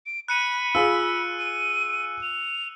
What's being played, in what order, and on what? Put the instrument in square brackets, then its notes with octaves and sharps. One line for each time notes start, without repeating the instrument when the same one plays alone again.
[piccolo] D7
[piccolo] B5 [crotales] F#6 C#7 D#7
[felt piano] F4 G#4 [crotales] E6
[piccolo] D#7
F7